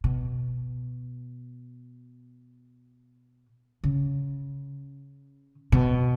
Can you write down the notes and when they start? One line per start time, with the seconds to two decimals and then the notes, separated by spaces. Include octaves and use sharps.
0.04 B2
3.84 C#3
5.72 B2